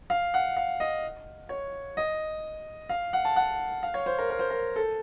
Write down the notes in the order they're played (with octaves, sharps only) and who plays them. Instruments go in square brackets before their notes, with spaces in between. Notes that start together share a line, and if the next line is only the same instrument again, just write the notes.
[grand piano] F5
F#5
F5
D#5
C#5
D#5
F5
F#5
A5
F#5
F5
C#5
C5
A#4
A#4
C5
A#4
A4